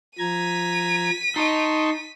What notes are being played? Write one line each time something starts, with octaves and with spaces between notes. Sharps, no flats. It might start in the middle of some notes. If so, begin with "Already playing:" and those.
F3 A#5 G#6 B6 D#7
D#4 D#5 A5 C6 C#6